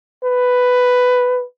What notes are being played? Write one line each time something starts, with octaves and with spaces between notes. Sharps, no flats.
B4